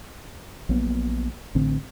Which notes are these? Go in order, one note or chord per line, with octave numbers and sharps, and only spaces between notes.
A#1 F#3 A#3 B3
A1 D3 C4